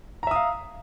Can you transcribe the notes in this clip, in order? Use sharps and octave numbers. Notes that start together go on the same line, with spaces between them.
E5 F5 A#5 D#6